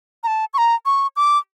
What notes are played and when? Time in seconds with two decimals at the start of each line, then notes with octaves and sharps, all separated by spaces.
0.24 A#5
0.27 A5
0.54 C#6
0.58 A#5
0.86 C#6
1.16 D6